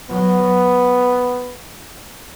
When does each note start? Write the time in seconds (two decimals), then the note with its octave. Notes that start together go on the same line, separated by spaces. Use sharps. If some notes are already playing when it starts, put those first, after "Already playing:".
0.09 F#3 B3